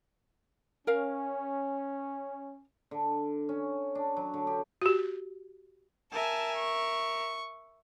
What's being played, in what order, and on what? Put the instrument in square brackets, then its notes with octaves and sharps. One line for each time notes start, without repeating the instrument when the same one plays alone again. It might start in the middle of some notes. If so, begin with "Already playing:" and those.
[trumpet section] C#4 [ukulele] A#4 F5
[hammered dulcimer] D3
C#4
D4
F#3
D3
G4
[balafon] F#4 G4
[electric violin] A#4 E5 [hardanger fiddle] G#5 A5
[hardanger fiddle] C#6